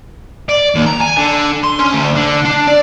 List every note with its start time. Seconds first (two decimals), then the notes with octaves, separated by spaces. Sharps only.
0.49 D5
0.75 D#2
0.86 A#5
1.01 G#5
1.17 D3
1.63 C6
1.79 C#4
1.93 D2
2.16 D3
2.45 D4
2.67 D5